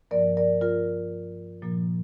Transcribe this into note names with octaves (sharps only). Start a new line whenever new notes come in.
G2 F3 A#3 A#4 D5
A#4 D5
F4 A#4
A#2 F3 A#3